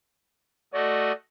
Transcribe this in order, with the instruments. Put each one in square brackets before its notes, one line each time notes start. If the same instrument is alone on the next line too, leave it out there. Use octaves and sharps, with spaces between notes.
[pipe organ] A3 F#4 D#5 [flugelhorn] D5